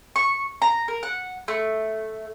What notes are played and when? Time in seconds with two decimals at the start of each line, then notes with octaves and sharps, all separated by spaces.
0.16 C#6
0.62 A#5
0.88 A#4
1.03 F#5
1.48 A3